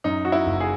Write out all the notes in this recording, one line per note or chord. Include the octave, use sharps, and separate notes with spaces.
F#2 D#4
F#4
E4
F#1
G#4